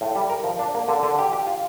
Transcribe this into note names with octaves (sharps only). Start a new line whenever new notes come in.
A2
G3
A#4
F3
D4
A#3
D3
D3
G4
G4
F4